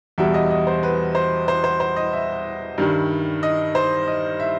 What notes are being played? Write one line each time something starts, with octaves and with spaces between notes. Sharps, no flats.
E2 B2 G3 E5
D#5
D#5
C5
B4
C5
C5
C5
C5
D#5
E5
G2 D#3 G3
D#5
C5
D#5
E5